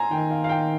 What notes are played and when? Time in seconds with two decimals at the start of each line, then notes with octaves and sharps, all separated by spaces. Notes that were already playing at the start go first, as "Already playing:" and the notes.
Already playing: G#5 A#5 C6
0.11 D#3 G5
0.31 F5
0.44 F5
0.49 G5